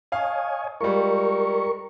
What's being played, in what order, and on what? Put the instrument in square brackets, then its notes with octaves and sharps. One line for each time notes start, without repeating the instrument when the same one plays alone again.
[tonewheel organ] C#5 D#5 G#5 [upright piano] F5 A5
[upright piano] G3 G#3 F4 [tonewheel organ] A#4 C#6